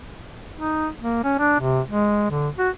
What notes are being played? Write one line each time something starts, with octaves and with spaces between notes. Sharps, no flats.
D#4
A#3
C#4
D4
C3
G#3
D3
F#4